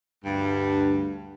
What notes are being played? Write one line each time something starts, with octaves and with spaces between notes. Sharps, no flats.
D2 G2